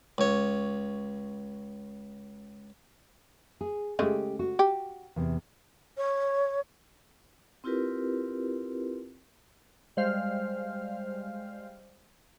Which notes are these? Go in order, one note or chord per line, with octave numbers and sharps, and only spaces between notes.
C#2 C#5
G#4
C#3 G#3 A3 C#4 G4
F#4
G4
E2 C3
C#5
C4 E4 F4 G4 A#4 B4
G3 G#3 C5 F5 F6